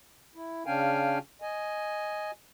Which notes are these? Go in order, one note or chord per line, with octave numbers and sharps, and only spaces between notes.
E4
C#3 C#4 D4 F5 G5 G#5
D#5 G#5